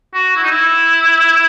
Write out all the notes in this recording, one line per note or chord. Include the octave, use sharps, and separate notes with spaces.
F#4
E4
D#4
E4